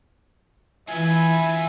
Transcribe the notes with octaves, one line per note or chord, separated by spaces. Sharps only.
E3 F4 B4 E5 G#5